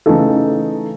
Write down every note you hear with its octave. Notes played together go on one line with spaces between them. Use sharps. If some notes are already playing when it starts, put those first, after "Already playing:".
C#3 E3 A3 D#4 A4